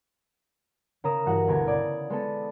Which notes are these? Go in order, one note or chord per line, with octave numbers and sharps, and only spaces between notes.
C#3 A#4 A#5 D#6 E7
G2 E3 F#4 F#6
G1 D2 B2 B3 G#5 A#5
C#3 D5 D#6 G#6
G#3 B3 A4